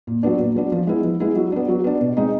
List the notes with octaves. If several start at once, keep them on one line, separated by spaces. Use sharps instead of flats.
A#2
F#3 B3 D4
A#2
F#3 B3 D4
F3
G#3 B3 E4
F3
G#3 B3 E4
F#3
B3 D4
F#3
B3 D4
B2
G#3 C4 D#4